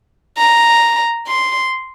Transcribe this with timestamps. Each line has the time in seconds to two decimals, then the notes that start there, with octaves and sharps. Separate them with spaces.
0.38 A#5
1.27 C6